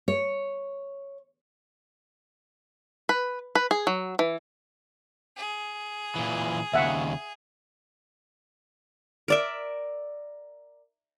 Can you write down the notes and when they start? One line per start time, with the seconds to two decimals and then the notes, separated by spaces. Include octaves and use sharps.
0.08 C#5
3.09 B4
3.55 B4
3.71 G#4
3.87 F#3
4.19 E3
5.37 G#4
6.15 A#2 E3
6.74 D#2 C#3 E5 F#5
9.28 A#4 D5 E5